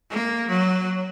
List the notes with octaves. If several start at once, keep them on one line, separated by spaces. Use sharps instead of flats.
A#3
F#3